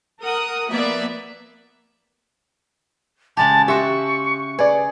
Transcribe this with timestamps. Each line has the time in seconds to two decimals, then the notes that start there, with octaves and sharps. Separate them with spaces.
0.22 A#4 F#5 D#6
0.69 F3 A#3 B3 D5 E5
3.37 C#3 G#3 G4 A5
3.68 F#4 G4 E5 C6 C#6
4.59 G#4 B4 D5